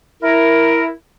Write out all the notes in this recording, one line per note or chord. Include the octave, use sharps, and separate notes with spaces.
E4 A#4